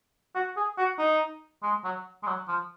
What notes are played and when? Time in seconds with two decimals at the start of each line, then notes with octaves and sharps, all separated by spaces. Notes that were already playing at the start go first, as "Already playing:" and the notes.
0.35 F#4
0.57 G#4
0.78 F#4
0.99 D#4
1.63 G#3
1.84 F#3
2.23 G#3
2.27 F#3
2.48 F3